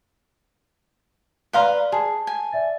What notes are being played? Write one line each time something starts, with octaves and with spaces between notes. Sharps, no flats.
B4 D5 F5 A#5 C6 G7
G#4 A5
G#5
D5 E5 A6